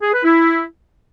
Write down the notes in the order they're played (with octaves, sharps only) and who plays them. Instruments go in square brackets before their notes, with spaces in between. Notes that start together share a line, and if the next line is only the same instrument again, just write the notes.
[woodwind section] G#4
B4
E4